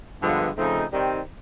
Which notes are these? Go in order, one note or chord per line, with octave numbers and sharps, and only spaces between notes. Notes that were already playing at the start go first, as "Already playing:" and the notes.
G2 D3 F3 G#3 B3
C#3 F3 A3 C4 D#4
D#3 G3 C4